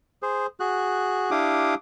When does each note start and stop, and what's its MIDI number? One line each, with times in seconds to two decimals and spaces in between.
0.22 0.47 68
0.22 0.47 72
0.60 1.30 66
0.60 1.30 68
0.60 1.30 90
1.31 1.75 62
1.31 1.75 64
1.31 1.75 67
1.31 1.75 77
1.31 1.75 86
1.31 1.75 87